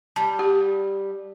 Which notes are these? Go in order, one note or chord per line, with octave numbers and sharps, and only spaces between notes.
G3 A5
G4